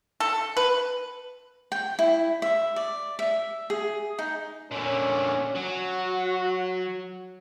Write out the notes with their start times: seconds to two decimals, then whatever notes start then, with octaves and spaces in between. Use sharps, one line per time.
0.20 A4
0.57 B4
1.72 G5
1.99 E4
2.42 E5
2.76 D5
3.19 E5
3.70 G#4
4.19 D#4
4.71 A#2 D3 C#4
5.55 F#3 F#4